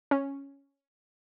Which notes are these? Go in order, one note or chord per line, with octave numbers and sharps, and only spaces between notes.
C#4